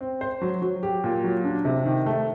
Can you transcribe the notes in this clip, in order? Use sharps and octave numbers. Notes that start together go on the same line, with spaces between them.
C4
C5
F#3
F#3
G4
A#2
F#3
D4
C3
D#3
A3